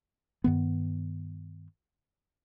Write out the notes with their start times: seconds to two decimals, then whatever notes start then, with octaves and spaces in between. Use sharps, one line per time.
0.44 G2 D#3 B3